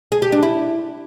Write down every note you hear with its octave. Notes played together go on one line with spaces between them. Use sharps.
G#4
G4
D4
E4